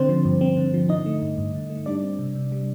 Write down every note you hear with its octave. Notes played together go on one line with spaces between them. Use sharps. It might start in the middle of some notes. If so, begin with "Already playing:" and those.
Already playing: D3 C4 C5
F3
G2
C4
D3
F3
D3 D#4 D#5
A3
G2
G2
D3
A3
G3 D4 D5
C4
C3
C3
G3